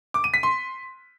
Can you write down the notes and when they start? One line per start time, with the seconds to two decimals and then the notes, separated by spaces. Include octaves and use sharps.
0.14 D6
0.24 D#7
0.34 B6
0.43 C6